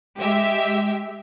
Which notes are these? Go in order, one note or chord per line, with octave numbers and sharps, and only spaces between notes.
G#3 G4 E5